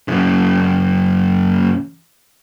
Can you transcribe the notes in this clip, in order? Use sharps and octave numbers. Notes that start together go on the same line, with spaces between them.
F#2 C#3